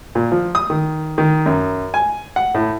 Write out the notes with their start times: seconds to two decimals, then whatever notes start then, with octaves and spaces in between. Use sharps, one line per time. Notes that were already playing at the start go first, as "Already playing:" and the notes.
0.15 A#2
0.32 F3
0.55 D#6
0.70 D#3
1.18 D#3
1.46 F#2
1.94 G#5
2.36 F#5
2.55 A2